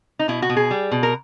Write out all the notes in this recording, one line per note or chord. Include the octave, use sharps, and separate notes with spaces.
D#4
B2 E4
F#4
B2
G#4
G3
B2
A#4